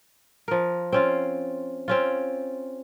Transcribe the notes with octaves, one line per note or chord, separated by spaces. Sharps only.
F3 A#4
C4 C#4 F4
C4 C#4 F4